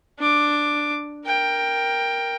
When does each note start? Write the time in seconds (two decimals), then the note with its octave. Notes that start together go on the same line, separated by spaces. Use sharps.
0.19 D4 D6
1.25 A#4 G5